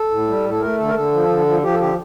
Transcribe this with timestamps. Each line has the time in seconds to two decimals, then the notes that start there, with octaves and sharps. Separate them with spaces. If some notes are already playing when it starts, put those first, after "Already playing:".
Already playing: A4
0.11 A2
0.28 G3
0.44 A2
0.50 A4
0.61 A3 A#4
0.78 D3 A4
0.88 A#4
0.95 D3 A4
1.12 F3
1.29 D3
1.46 F3
1.62 F3 G4
1.72 A4
1.79 D3 G4